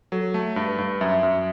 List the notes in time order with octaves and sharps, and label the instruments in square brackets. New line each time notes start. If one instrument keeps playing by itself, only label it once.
[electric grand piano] F#3 [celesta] A4
[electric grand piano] A3 [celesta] A4
[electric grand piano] G2
[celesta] B4
[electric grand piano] G2
[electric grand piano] F#2 [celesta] E5
[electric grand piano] F#2